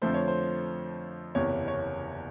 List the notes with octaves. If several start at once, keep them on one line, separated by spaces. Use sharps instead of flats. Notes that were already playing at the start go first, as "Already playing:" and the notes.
F2 D3 F3 A3 C5
C#5
C5
F#1 E2 C3 C#5
C#5